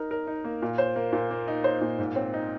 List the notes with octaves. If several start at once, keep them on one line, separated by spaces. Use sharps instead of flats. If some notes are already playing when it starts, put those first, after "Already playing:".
Already playing: D#4 A#4
A#4
D#4
A#3
A#2
C5
A#3
A#2
A#3
D#4
C5
A#2
G#2
C4
D#4